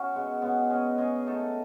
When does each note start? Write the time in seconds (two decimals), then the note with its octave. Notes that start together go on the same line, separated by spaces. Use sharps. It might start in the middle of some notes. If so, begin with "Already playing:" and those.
Already playing: C#4 E4 F#4
0.13 C#3 G#3 B3
0.42 C#3 G#3 B3
0.69 G#3 C#4 G#4 D#5
0.97 G#3 C#4 G#4 D#5
1.26 A3 D#4 A4 D#5